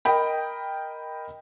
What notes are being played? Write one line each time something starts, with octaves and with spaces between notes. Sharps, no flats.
A#4 D#5 G5 B5